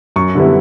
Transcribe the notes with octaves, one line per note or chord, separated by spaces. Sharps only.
F#2 C#6
D3 G3 B3 E4